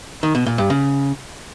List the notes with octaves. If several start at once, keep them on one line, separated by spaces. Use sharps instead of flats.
D#3
B2
A#2
G2
C#3